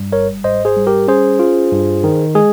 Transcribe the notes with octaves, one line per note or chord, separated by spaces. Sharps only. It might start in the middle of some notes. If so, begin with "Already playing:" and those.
Already playing: G2 G3
G1 A#4 C#5
G#2 C5 D#5
G#4 C5
G3
G4 A#4
C#4 G#4 C5
F4
G2
D#3
G#3 G#4